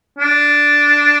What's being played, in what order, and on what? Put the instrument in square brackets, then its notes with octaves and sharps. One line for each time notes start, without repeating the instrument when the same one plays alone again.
[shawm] D4